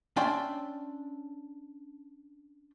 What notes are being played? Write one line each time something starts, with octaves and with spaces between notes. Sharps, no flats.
C#4 D4 D5 E5 G5 C6